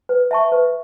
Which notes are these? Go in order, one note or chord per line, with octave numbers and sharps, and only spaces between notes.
B4
E5 A5 C#6
B4